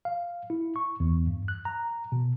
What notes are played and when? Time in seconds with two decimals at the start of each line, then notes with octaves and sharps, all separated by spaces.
0.05 F5
0.50 E4
0.76 C#6
1.00 E2
1.27 G2
1.48 F#6
1.65 A#5
2.12 B2